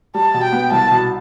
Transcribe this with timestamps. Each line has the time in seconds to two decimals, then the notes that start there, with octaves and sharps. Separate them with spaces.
0.14 G3 A5
0.34 B2
0.43 G5
0.53 B3
0.71 C2 A5
0.91 B2